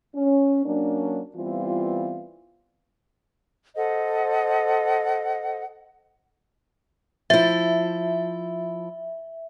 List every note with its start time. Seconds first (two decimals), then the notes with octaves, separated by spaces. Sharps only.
0.15 C#4
0.64 F#3 A#3 C#4 D4
1.35 E3 G3 B3 C4 F4
3.76 A4 C5 D#5 F#5
7.30 F3 E4 E5